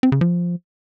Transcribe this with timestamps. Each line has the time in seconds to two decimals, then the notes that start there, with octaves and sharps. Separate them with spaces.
0.03 C4
0.12 C#3
0.21 F3